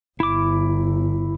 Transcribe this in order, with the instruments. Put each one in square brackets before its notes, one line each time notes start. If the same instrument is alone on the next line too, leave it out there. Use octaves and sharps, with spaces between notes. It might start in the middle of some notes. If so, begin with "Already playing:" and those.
[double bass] G1 [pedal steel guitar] E4 D6